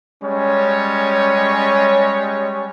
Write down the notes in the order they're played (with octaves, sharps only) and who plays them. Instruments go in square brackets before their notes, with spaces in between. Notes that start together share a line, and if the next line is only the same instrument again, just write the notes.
[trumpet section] G3 G#3 C#4 C#5